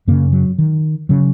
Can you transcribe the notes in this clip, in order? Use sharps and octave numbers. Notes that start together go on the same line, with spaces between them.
F#2 C#3 A#3
F#3
D#3
C#3 F#3